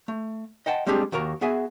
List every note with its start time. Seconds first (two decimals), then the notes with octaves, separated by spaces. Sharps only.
0.08 A3
0.66 D#5 F#5 G5 A5 C6
0.87 G3 G#3 C4 D4 G4 G#4
1.12 D#2 F#4 A#4 A#5
1.41 B3 F#4 G#4 E5 G#5